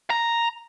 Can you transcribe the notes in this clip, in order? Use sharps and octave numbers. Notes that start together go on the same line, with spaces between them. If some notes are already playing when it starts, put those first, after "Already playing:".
A#5